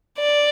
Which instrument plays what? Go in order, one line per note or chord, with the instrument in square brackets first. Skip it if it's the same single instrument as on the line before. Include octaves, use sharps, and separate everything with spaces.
[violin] D5